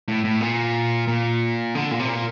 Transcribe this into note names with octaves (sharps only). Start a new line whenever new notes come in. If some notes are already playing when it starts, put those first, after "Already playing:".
A2
A2
A#2
A#2
D3
A#2
C3
A#2